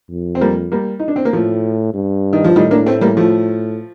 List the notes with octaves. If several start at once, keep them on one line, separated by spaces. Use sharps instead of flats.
F2
C4
G3 A#3
G3 A#3
D#4
D4
C4
A#3
A2 F3 A3
G2
D#3
F3
A2 D#3 G3
A#3 D4
A3 C4
G3 A#3
F3 A3